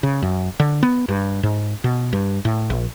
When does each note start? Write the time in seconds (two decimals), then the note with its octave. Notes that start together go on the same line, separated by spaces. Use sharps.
0.03 C#3
0.22 F#2
0.60 D3
0.83 B3
1.09 G2
1.43 G#2
1.84 B2
2.13 G2
2.45 A2
2.70 A#1